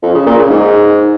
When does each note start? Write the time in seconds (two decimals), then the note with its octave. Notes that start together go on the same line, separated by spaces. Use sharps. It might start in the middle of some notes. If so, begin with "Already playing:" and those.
0.03 F2
0.14 C#3
0.26 A#2
0.38 C#3
0.50 G#2